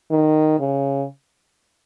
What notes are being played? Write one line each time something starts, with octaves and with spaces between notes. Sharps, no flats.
D#3
C#3